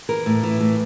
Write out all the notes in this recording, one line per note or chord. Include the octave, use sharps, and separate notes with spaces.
E3 A#4
A2
E3
A2